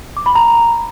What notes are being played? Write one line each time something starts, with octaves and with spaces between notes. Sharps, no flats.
D6
B5
A#5